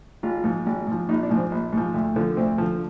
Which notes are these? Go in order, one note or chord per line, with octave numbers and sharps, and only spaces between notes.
G#1 F4
G#2 F3
G#1
G#2 F3
A#1 D#4
D4
G#2 F3
C4
A#1
G#2 F3
D2
D3 F3
D2 C4
D3 F3